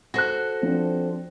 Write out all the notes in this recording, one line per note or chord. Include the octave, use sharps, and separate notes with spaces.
F#4 A4 C5 F#6 A#6
F3 C4 D4